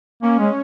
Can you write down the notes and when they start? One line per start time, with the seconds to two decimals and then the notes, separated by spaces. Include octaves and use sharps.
0.22 A#3 C#4
0.39 G#3